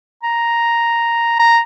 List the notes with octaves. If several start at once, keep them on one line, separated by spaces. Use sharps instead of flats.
A#5
A#5